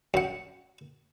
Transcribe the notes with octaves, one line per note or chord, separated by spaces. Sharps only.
F#2 F#5